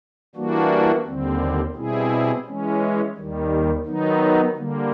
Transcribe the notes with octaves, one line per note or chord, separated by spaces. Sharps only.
E3 G3 A#3 D4 F#4
D#2 D3 G3 C4
B2 G3 C4 E4 G#4
E3 G#3 C#4
D#2 D#3 G3
D#3 F#3 B3 D#4
D3 G3 A#3